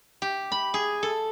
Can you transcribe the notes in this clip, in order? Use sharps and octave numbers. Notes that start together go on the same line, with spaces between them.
G4
B5
G#4
A4